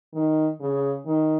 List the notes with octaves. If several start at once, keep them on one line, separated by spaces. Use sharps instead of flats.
D#3
C#3
D#3